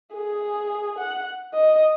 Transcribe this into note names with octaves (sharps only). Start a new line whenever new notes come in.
G#4
F#5
D#5